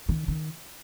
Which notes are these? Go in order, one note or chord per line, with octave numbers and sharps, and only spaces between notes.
D#3
D#3